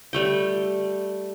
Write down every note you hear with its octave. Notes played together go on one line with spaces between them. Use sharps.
G3 A3 G5